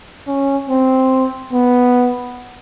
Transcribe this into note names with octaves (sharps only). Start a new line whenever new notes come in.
C#4
C4
B3